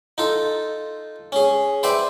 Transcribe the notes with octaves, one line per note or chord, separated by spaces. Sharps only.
D#4 F4 A4
C#4 G#4
B4 C5 D5 E5 G5